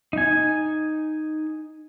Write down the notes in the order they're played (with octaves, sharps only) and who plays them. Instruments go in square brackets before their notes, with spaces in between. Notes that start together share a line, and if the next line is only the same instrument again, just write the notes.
[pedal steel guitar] D#4 G#5